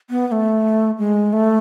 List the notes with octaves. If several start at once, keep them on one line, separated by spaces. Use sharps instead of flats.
B3
B3
A3
G#3
A3